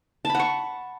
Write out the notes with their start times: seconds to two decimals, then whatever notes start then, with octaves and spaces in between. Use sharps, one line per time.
0.25 A5
0.30 B5
0.35 F#5
0.39 C#6